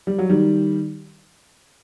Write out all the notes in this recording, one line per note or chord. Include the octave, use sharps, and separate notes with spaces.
G3
F#3
D#3 G3